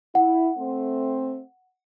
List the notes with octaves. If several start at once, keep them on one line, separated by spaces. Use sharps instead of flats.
E4 F#5
A3 C4